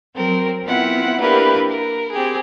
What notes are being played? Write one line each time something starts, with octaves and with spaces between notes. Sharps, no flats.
F#3 C4 A#4
B3 C4 E4 F4 F#5
A#3 D4 E4 G4 A#4 B4
A#4
C4 G4 G#4